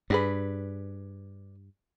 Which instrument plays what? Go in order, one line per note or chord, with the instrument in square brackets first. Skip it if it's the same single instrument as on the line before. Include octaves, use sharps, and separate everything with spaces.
[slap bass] G2 [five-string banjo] D4 G#4 B4